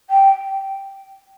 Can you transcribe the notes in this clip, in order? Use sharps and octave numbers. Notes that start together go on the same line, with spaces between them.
G5